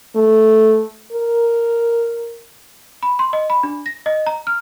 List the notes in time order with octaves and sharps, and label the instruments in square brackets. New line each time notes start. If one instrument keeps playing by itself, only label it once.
[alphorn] A3
A#4
[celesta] B5
C6
D#5
B5
D4
A#6
D#5
A#5
F6